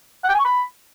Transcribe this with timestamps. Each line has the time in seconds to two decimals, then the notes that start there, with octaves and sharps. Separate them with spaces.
0.24 F#5
0.29 G5
0.34 G#5
0.39 C#6
0.45 B5